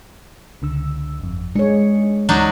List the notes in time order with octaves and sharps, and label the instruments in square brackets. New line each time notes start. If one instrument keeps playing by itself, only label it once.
[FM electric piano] C#2 D3 E6
G1 F2
[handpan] G#3 C#5 [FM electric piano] D4 G#4 C#7
[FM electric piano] D2 E3 [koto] F#3 D4 D#4